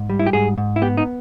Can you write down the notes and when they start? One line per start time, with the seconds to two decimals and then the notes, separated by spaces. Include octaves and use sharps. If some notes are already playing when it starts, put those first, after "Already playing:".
Already playing: G#2
0.10 G3
0.19 E4
0.26 G4
0.33 G#2 G#4
0.58 G#2
0.76 E4
0.82 B3 G4
0.97 D#4